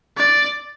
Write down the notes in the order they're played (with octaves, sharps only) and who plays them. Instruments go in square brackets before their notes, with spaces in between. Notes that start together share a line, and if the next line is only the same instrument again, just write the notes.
[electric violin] D5